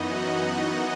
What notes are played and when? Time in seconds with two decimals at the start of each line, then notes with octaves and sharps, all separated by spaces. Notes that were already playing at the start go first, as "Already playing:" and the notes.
Already playing: F#2 E3 B3 D#4 F#4 D#5 F#5